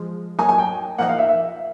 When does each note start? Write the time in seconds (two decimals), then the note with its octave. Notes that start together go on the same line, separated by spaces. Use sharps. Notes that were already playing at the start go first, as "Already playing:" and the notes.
Already playing: F3 G#3
0.39 F#3 A#3 D#4 G#5
0.49 G#5
0.58 G5
0.98 A#2 F3 A#3 D#4 F#5
1.09 F5
1.19 E5
1.29 E5